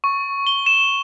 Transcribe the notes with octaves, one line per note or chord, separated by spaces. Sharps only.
C#6
G7
E7